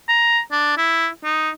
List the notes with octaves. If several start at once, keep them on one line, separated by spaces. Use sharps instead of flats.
A#5
D4
E4
D#4